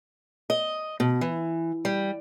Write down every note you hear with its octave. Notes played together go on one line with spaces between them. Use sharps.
D#5
B2
E3
G3